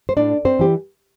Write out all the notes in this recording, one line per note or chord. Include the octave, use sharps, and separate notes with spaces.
C5
A2 D4 D5
C4 C5
E3 G4